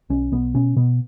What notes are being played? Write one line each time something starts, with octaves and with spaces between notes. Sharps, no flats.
B1 C#4
B1 B3
B2 C#4
B2 B3